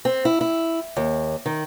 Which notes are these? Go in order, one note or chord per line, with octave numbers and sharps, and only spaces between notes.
C4
E4
E4
D#2
D#3